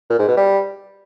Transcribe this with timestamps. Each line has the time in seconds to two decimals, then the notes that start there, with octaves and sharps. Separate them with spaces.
0.10 A#2
0.19 G#2
0.28 B2
0.37 G3